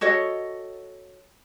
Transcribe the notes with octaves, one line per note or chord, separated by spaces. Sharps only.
F#4 A4 C#5 D#5